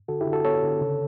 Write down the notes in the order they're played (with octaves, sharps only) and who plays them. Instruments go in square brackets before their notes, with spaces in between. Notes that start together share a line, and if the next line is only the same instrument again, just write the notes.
[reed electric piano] D3 F#4 A4
E4 G4
D3
F#4 A4
B3 A4 C#5
D3
C#3